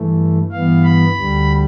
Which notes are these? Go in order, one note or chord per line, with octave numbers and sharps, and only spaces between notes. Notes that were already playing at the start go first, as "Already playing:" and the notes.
Already playing: G2 E3 A3
G2 E3 B3 F5
B5
D2 D3 G3